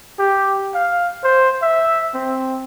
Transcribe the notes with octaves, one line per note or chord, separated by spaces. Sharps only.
G4
F5
C5
E5
C4